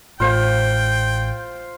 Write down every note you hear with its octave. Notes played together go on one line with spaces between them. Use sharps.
A1 A2 F4 C5 G5